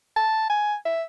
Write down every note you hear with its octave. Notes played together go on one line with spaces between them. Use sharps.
A5
G#5
E5